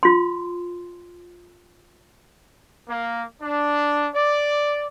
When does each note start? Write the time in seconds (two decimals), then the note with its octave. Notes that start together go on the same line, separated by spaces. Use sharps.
0.03 F4 C6
2.87 A#3
3.41 D4
4.15 D5